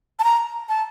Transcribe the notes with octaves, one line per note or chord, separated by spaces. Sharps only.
A5
A#5
A5